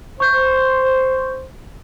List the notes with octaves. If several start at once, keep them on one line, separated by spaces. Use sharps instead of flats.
C5 C#6 G6